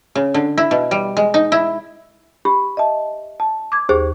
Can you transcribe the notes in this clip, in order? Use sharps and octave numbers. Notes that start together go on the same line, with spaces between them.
C#3
D3
E4
B2
G3
G#3
D#4
E4
G4 B5
D#5 E5 A5
A5
D6 G#6
D#2 G4 G#4 C5